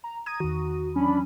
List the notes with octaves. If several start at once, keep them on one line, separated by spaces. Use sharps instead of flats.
A#5
A#5 D#6 G#6 D#7
E2 D#3 F#4
E3 F#3 C#4 D4 B5